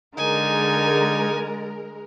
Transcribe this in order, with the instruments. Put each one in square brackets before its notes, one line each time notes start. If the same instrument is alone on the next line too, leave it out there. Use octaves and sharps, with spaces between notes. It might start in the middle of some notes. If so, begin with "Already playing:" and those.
[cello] D3 [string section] G#3 A#4 [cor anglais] D#4 [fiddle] G#5